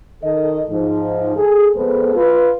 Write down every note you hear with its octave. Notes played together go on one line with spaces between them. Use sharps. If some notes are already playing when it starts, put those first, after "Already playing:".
D#3 A4 D#5
G#2 F3 D#4
G#4 A4
F2 G#3 B3 A4 B4 C5
F4 B4